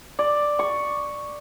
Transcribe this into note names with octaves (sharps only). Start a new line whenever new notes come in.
D5
C#6